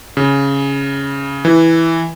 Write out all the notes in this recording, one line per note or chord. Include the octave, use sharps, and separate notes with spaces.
C#3
E3